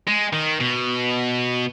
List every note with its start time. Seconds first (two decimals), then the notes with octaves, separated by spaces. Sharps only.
0.07 G#3
0.33 D#3
0.60 B2